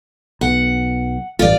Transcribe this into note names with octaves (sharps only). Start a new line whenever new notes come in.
B1 B2 F#5
A1 G2 F4 D5